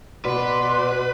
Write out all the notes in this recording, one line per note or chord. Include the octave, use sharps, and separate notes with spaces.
B2 F#4 B4 D5 C6